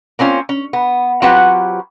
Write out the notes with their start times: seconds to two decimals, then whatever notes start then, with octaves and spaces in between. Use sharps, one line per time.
0.19 A#3 C4 C#4 F4
0.49 C#4
0.73 B3
1.22 F#3 C4 F4 G4 B4 F#5